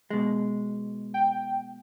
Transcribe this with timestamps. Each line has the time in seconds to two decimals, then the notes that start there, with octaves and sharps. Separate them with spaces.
0.10 B2 G#3
1.14 G5